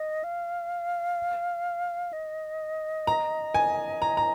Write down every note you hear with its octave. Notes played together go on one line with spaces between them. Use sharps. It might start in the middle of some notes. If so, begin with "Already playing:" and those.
Already playing: D#5
F5
D#5
A#5
G#5
A#5
A#5